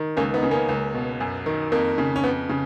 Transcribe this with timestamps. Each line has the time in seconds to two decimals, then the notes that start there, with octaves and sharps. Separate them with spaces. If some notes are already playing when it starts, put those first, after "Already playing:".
Already playing: D#3
0.17 C#2 A#3 C#4
0.34 B3 D#4
0.43 C#3
0.51 A#3 C#4
0.69 C#2
0.94 B2
1.20 F#2
1.46 D#3
1.72 F2 A#3
1.98 C#3
2.16 C#4
2.24 F2 B3
2.49 C#3